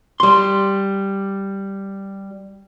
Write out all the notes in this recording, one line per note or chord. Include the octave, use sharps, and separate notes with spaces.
G3 C6